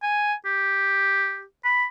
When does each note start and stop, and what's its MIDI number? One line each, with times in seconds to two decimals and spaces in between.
0.03 0.33 80
0.45 1.43 67
1.64 1.86 83